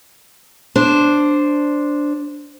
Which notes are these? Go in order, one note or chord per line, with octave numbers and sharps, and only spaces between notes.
D4 C5